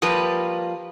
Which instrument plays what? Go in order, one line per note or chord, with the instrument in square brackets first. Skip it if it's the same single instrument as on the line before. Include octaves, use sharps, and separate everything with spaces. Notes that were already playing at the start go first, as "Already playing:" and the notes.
[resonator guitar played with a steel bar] F3 G3 A#3 B4